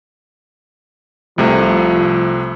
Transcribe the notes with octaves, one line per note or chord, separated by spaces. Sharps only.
C2 C3 F3 A3